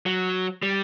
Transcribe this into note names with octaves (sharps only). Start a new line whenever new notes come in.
F#3
G3